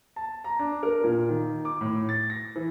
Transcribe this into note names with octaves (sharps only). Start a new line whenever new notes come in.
A5
A#5
D4
A#4
A#2
D#3
D6
A2
A6
A#6
E3